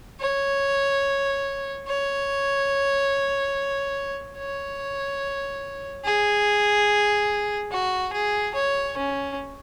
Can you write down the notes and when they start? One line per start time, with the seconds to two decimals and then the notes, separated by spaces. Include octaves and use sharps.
0.21 C#5
1.88 C#5
4.38 C#5
6.05 G#4
7.72 F#4
8.13 G#4
8.55 C#5
8.97 C#4